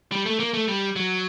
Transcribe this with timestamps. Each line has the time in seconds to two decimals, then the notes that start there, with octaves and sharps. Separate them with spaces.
0.12 G3
0.26 A3
0.40 A#3
0.54 A3
0.68 G3
0.96 F#3